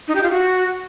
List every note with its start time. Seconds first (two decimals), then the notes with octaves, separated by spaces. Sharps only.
0.08 D#4
0.15 G4
0.23 F4
0.31 F#4